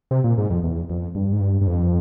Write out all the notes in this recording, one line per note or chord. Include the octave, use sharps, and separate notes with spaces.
C3
A#2
G#2
F2
E2
F2
G2
G#2
G2
G2
F2